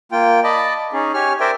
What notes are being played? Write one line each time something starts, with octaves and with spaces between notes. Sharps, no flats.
A#3 F4 G5
D5 D#5 A5 B5
C#4 D#4 G#4
G4 C#5 G#5 F6
A#4 C5 D5 E5 G5